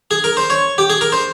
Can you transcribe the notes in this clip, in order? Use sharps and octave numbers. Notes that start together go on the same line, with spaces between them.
G#4
A#4
C5
C#5
G4
G#4
A#4
C5